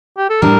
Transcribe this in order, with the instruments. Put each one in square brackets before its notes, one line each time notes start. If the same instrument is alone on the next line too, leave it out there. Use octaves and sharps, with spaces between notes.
[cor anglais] G4
A4
[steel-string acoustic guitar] A2 G3 D4 [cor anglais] A#4